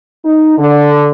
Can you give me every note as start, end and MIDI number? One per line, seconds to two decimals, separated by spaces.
0.24 0.54 63
0.58 1.09 50